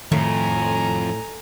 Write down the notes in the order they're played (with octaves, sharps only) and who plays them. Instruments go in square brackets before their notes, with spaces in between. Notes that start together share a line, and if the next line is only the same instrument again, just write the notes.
[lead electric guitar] F2 [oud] A2 [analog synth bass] D#3 [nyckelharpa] G#5 A#5